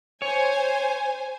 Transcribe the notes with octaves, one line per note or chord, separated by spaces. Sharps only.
C5 C#5 G#5